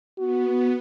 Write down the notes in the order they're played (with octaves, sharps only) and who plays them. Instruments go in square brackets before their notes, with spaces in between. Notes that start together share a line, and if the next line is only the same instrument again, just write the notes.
[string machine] B3 [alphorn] F#4